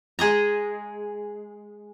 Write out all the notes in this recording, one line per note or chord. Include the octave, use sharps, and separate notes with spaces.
G#3 G#4 D#5 A#5